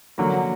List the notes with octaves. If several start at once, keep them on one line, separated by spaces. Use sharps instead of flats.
D3 F#3 A#3